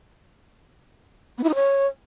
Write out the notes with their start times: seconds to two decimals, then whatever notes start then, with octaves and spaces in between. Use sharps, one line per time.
1.38 B3
1.44 E4
1.49 D#4
1.55 C#5